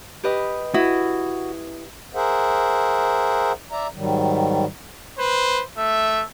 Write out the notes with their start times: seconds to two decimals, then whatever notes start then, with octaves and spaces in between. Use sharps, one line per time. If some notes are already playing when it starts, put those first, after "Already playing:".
0.23 G4 B4 D#5
0.74 E4 F#4 D#6
2.14 G#4 A#4 C5 E5 F#5
3.72 D5 E5 A#5
3.95 G#2 D#3 F#3 G3
5.18 B4 C5
5.77 A3 E5